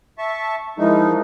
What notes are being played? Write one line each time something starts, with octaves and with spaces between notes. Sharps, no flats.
E5 A5 C#6
E3 F3 G#3 D#4 E4 A#4